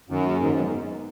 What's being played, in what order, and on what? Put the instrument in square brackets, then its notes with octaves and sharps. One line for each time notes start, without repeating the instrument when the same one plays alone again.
[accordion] F#2 [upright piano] D#3
[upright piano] A#3 C#4 G#4
[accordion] G#2 [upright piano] D#3
[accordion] F#2
[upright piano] G#3 B3 D#4